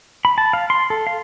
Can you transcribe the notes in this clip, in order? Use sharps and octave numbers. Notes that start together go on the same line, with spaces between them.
B5
A5
F5
C6
A4
F5